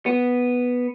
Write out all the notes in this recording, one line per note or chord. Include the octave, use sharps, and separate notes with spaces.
B3